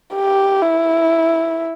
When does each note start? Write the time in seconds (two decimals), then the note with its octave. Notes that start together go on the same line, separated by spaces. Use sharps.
0.14 G4
0.62 E4